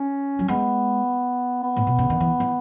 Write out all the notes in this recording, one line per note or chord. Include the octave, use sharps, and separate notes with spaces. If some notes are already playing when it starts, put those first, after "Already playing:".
Already playing: C#4
F#3
G#3 B3
B3
A2
B2
C#3
D#3
E3
E3